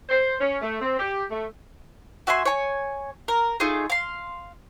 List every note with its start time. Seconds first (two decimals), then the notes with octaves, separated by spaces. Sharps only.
0.09 C5
0.40 C#4
0.62 A3
0.82 C4
0.99 G4
1.31 A3
2.27 F#4 E5 G#5 C6
2.46 C#5 G#5
3.28 A#4
3.60 A3 D#4 F4 G#4
3.90 F5 C6